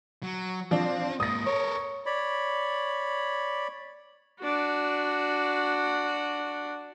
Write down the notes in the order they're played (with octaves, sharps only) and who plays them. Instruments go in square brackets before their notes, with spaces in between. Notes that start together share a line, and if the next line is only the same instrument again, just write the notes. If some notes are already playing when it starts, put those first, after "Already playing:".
[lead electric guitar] F#3
[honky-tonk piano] F3 D4 [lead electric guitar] C4
[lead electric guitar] G#2 A#3 [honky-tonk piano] D#6 A#6
[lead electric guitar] A4 A#4 [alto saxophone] C#5
[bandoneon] C#5 D5 B5
[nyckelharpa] D4 F#4